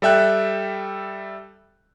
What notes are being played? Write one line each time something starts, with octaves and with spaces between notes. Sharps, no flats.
G3 A4 E5 G5 F#6